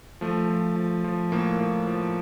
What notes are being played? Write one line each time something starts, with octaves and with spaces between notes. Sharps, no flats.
F3 A3
F3
F3
F3
A2 A#3
A2
F3